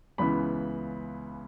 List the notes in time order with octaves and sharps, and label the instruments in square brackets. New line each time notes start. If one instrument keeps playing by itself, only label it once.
[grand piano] C#2 C#3 E3 B3 B5